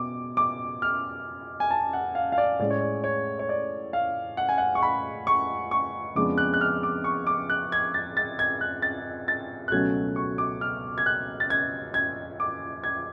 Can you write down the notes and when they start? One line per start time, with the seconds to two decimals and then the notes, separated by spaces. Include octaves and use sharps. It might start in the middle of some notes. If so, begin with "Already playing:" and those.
Already playing: B2 B3 D6
0.37 D6
0.82 F6
1.60 G#5
1.71 A5
1.93 F#5
2.15 F5
2.32 F5
2.38 D5
2.59 A2 G#3 C#4 D5
2.70 C#5
2.81 D5
3.04 C#5
3.39 C#5
3.49 D5
3.93 F5
4.37 F#5
4.49 G#5
4.58 F#5
4.75 C#6
4.83 B5
5.27 C#6
5.71 C#6
6.15 F2 C#3 G#3 B3 D4 D6
6.38 F#6
6.54 F#6
6.61 F6
6.83 D6
7.04 C#6
7.27 D6
7.50 F#6
7.72 G#6
7.94 A6
8.17 A6
8.39 G#6
8.61 F#6
8.82 A6
9.28 A6
9.68 F#6
9.72 C#2 B2 F#3 A3 C#4 G#6
10.16 C#6
10.38 D6
10.61 F6
10.98 G#6
11.06 F#6
11.40 A6
11.50 G#6
11.94 G#6
12.40 D6
12.84 G#6